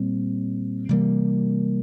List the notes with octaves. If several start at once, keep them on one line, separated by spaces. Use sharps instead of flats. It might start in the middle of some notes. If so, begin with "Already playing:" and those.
Already playing: A#2 G3 C4
C3 E3 G3 A#3